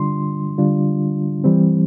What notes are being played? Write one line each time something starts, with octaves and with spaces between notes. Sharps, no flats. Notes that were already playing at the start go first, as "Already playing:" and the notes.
Already playing: D3 G3 D4 F4 C6
D3 G3 D4 F4
E3 G3 C4